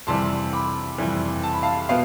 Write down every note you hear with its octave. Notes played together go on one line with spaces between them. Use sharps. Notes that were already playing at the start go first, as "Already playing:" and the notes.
F2 C3 E3 G3 A5 C6
B5 D6
F2 C3 E3 G3
A5
B5
F5 A5
B2 B3 F5